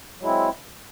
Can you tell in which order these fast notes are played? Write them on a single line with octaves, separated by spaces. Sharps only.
F#3 G#3 E4 C4